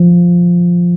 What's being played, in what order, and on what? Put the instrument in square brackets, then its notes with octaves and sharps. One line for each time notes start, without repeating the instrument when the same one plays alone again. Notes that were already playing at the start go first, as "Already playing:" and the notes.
Already playing: [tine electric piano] F3